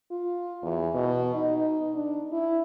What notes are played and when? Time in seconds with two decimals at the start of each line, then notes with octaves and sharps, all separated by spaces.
0.11 F4
0.62 E2
0.94 B2
1.35 D#4
1.95 D4
2.32 E4